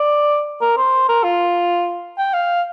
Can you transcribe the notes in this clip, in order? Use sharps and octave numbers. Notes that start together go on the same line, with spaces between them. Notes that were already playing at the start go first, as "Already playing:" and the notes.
Already playing: D5
A#4
C5
A#4
F4
G5
F5